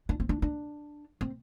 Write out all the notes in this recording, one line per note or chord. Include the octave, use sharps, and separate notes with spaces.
D4
C4
D4
D4
C4